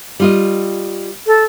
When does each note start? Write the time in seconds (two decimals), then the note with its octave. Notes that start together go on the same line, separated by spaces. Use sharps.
0.20 G3 F4 D#5
1.27 A4